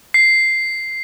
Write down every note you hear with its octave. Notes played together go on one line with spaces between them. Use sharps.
C7